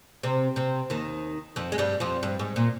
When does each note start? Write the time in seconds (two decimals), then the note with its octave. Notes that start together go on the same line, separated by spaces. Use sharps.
0.23 C3 C4
0.56 C3 C4
0.90 D#2 D#3
1.56 F2 F3
1.72 G#3
1.78 G2 G3
2.00 F2 F3
2.23 G2
2.39 G#2
2.56 A#2